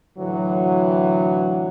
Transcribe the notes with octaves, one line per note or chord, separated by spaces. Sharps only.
A2 D3 E3 F#3